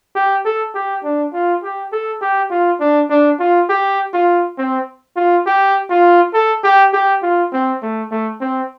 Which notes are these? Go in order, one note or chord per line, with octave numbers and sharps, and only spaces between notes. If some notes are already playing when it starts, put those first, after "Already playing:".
G4
A4
G4
D4
F4
G4
A4
G4
F4
D4
D4
F4
G4
F4
C4
F4
G4
F4
A4
G4
G4
F4
C4
A3
A3
C4